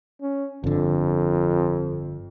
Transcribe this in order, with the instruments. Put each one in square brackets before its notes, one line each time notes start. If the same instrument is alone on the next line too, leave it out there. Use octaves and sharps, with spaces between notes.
[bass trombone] C#4
[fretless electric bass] G1 D3 [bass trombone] F2